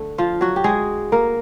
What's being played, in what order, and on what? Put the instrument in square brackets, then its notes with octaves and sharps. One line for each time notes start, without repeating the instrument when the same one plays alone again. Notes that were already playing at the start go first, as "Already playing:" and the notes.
Already playing: [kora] D3 A3
F3 F4
F#3 F#4
G4
G#3 G#4
A#3 A#4